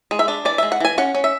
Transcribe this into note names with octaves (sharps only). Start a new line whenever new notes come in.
G#3
E5
D4
E3 D5
G#3 E5
F#5
E3 G#5
C#4 F#5
C#4
E5